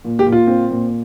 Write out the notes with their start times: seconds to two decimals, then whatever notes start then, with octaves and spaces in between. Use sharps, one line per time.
0.05 A#2
0.19 G4
0.26 A#2
0.32 F4
0.47 C4
0.70 A#2